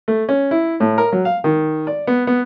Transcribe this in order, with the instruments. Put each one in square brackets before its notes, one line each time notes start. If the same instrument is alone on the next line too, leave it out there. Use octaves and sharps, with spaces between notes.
[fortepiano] A3
C#4
E4
A2
A#4
F#3
F5
D#3
D5
B3
B3